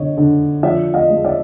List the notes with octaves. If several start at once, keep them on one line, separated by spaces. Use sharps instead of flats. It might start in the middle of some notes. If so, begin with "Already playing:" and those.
Already playing: D3 C#5 D#5
D3
F3 D5 E5
D#5 F5
G#3
D5 E5